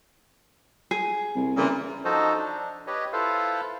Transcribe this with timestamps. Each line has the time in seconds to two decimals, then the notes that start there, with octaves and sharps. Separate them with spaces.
0.91 G#4
1.35 C2
1.57 A#2 C#3 E3
2.05 F3 D#4 F#4 A4 C5 D#5
2.38 D4
2.87 G4 B4 C#5 D#5
3.13 E4 F4 A4 B4 C5 F5